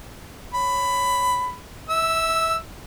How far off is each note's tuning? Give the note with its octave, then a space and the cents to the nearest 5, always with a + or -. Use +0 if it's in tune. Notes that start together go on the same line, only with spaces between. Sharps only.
C#5 +0 B5 +15
E5 -20 E6 +0